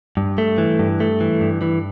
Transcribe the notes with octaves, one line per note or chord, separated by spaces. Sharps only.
G2
A3
E3
G2
A3
E3
G2
E3